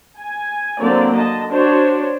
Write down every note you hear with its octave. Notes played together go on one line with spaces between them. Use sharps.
G#5
D3 F#3 A#3 C4 D5
D3 D#5 A5
D4 F#4 C5 C#5